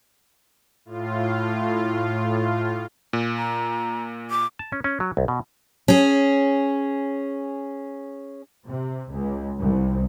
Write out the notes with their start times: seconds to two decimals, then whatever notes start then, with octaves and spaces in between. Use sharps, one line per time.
0.85 A2 F4
3.13 A#2
3.37 A#5
4.31 D6
4.59 A5
4.72 C#4
4.84 C#4
5.00 F#3
5.17 C2
5.28 B2
5.88 C#4 G#4
8.67 C3
9.12 C#2
9.60 C2